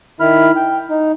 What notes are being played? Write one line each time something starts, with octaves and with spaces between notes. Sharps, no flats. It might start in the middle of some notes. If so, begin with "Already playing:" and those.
D#3 E4 B5 F6
G5
D#4